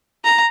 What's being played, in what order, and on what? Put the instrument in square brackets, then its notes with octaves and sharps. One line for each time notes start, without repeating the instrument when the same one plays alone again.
[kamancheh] A#5